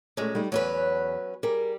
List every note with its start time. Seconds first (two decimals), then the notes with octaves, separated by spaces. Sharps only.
0.17 A#2 G#3 A3 C#4
0.35 G3 A3 D#4
0.52 E2 F#3 C#4 B4
1.43 G3 G#4 A#4